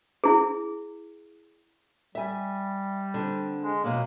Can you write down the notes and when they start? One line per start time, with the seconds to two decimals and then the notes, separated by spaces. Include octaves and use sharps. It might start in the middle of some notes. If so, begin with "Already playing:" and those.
0.24 E4 G#4
2.15 G3 E5 G#5
3.14 D3 C4
3.62 G#3
3.84 E2 B2 F#3 A#3